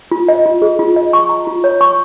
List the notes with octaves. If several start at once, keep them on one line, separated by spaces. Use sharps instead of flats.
F4
D#5
F4
G#4
F4
D#5
C#6
A#5
F4
C#5
C#6